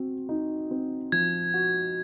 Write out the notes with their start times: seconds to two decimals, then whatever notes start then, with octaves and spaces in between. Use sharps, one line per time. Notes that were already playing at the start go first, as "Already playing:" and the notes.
Already playing: C4 F#4
0.29 D#4
0.71 C4
1.12 F3 G#6
1.54 F#4